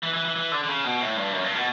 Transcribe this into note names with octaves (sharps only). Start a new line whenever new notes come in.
E3
E3
E3
E3
D3
D3
C#3
B2
A2
G2
F#2
G2
B2